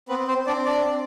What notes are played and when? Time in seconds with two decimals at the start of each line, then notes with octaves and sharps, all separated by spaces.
0.09 B3 C4 B4
0.28 C4 C5
0.46 C4 D4 D5
0.65 D4 D5
0.85 C4